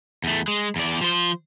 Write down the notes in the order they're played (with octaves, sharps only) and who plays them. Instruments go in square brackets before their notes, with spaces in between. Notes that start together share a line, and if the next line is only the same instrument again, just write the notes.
[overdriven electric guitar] E2 A3
G#3
E2 D5
F3 C5